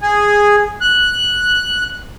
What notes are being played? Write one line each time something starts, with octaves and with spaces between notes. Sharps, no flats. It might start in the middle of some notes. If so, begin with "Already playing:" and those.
G#4
F#6